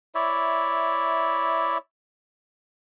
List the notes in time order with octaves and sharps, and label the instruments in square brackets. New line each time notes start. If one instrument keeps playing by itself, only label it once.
[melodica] E4 C#5 D5 E5